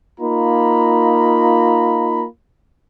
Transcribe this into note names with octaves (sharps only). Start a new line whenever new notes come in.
A#3 D#4 F4 A#5 B5